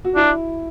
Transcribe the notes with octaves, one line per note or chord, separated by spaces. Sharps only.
F#4
D4 E4